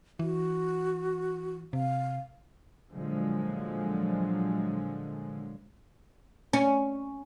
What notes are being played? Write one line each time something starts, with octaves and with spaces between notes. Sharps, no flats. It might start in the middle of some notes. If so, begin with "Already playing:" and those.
E3 F#4
C3 F5
A#2 D3 F3 F#3 G#3
C#4